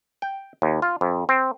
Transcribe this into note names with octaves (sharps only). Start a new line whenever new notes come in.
G5
D#2
F4
F2
C4